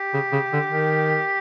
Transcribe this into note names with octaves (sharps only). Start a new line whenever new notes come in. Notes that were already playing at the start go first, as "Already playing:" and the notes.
Already playing: G4
C#3
C#3
D3
D#3